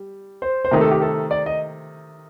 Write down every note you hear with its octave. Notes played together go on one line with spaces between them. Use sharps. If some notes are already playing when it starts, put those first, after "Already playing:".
Already playing: G3
C5
C5
C3 D#3 A3 A#4
A4
G4
A4
D5
D#5